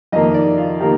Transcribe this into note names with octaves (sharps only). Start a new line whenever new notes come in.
F2 D#3 A#3 D#5
D5
F4
D#3 A#3 G4